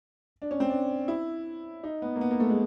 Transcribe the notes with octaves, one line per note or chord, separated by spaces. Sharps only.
D4
C#4
C4
D4
E4
D#4
B3
A#3
B3
A#3
A3
G#3